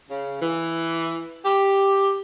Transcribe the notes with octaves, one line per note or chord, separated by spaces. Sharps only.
C#3
E3
G4